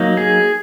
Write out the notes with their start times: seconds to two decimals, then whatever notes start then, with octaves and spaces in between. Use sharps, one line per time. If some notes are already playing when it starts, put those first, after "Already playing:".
Already playing: F#3 A#3 D#4
0.17 G#4